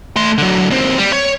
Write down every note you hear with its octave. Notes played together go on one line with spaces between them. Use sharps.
A3 C6
D3 F#3
D#2 C4
G3
C#5